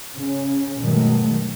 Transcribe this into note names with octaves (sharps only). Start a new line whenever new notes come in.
C#3 C#4
G2 B2 D#3 F#3 G#3 A3